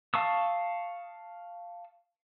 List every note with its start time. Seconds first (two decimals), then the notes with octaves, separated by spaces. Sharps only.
0.14 F5 A5 C#6 D#6 E6